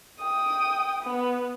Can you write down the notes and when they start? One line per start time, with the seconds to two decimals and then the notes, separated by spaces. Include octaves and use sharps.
0.20 G5 D#6
1.03 B3